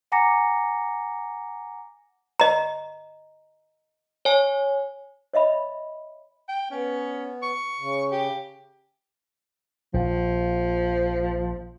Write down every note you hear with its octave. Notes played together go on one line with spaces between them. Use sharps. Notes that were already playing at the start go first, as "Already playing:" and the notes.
F#5 G#5 A#5 D6 A#6 C#7
D#5 A#5
C#5 G#5
C#5 D#5 E5 B5
G5
B3 C#4
C#6
C#3
G4
A#1 F3